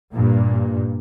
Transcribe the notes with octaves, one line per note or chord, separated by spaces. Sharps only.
G2 A#2